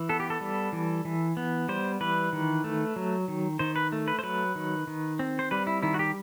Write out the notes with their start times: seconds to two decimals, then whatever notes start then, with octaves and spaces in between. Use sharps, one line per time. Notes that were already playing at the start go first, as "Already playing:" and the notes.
Already playing: E3
0.09 B3 A4
0.20 G4
0.30 A4
0.41 G3
0.73 E3
1.05 E3
1.37 B3
1.69 G3 C5
2.01 E3 B4
2.33 D#3
2.64 A3
2.96 F#3
3.28 D#3
3.59 D#3 C5
3.76 B4
3.92 A3
4.08 B4
4.19 C5
4.23 F#3 B4
4.55 D#3
4.87 D#3
5.19 C4
5.39 C5
5.51 G3 B4
5.67 E4
5.83 D#3 E4
5.94 F#4
5.99 G4